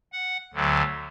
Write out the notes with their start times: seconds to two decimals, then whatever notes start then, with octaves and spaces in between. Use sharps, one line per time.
0.12 F#5
0.54 D2 D3 F#3